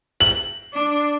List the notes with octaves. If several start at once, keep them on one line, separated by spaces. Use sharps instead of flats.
F#7
D4